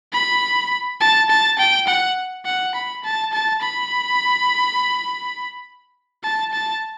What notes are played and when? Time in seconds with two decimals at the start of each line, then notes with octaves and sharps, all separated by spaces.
0.13 B5
1.00 A5
1.30 A5
1.59 G5
1.87 F#5
2.45 F#5
2.75 B5
3.04 A5
3.33 A5
3.62 B5
6.23 A5
6.53 A5